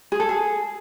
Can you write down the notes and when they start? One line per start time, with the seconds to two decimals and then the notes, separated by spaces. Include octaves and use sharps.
0.12 G#4
0.20 A4
0.29 G#4